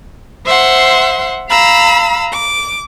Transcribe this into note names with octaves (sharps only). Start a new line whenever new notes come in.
C5 E5 F#5 C6
F5 A#5 B5 E6
D6